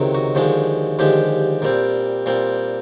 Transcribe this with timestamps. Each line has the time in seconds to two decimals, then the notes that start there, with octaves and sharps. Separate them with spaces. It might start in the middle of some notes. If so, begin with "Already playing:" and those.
Already playing: C#2 C3 D#3 F#3
0.15 F#4
0.35 D#2 D3 F3 G#3
0.99 D#2 D3 F3 G#3 G4
1.62 A#2 G3 C4
2.26 A#2 G3 C4